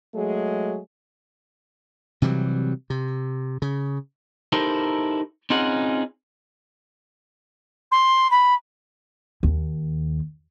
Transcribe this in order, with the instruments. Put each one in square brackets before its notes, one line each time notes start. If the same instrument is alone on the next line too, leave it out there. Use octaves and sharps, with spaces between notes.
[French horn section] F#3 G#3 A3 G#4
[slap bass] C3 E3 F#3 G3
C3
C#3
[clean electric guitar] D#4 E4 G4 A4 A#4 C5
C4 C#4 D#4 F4 G#4 F#5
[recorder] C6
B5
[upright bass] D#2